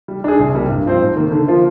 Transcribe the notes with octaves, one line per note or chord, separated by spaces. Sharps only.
G3
D4 G#4
C2
C3 G3 A#3
G2
F3 C4 F4 C5
G#2
D#3 A#3
D3
F3 A#3 F4 C5